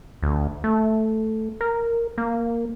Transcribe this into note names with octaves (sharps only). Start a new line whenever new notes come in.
D2
A3
A#4
A#3